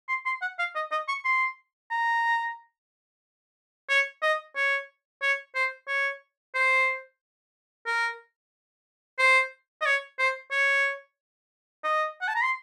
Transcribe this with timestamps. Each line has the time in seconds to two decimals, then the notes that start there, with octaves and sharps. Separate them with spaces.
0.09 C6
0.25 C6
0.41 F#5
0.58 F5
0.75 D#5
0.91 D#5
1.08 C#6
1.25 C6
1.91 A#5
3.89 C#5
4.22 D#5
4.56 C#5
5.22 C#5
5.55 C5
5.88 C#5
6.54 C5
7.86 A#4
9.19 C5
9.81 D#5
9.85 C#5
10.19 C5
10.51 C#5
11.84 D#5
12.21 F#5
12.28 A5
12.35 A#5
12.43 C6